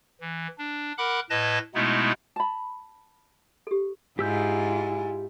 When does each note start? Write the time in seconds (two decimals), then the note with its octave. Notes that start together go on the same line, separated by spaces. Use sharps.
0.21 E3
0.58 D4
0.98 A#4 F#5 B5 D6 F#6
1.30 A2 B4 D#5 A5 G#6 A#6
1.75 B2 G#3 A3 B3 D#4 E4
2.36 A5 B5
3.67 G4 A4
4.19 G#2 E4 F4 G4 G#5 E6 G6